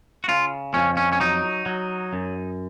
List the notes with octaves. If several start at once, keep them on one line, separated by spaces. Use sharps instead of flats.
F#4
C#3 F4
F2 C#4
C#4
C#4
F#3 D#4
F#3
F#2